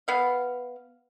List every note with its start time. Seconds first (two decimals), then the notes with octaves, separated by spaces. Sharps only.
0.08 B3 F5